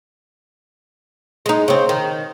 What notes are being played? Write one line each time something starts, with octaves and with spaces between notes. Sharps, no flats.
G#3 D#4
C#3 C4
D#3